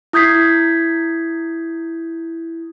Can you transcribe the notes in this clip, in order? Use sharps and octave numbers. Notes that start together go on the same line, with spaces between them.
E4 D#6 G6 G#6 B6 C7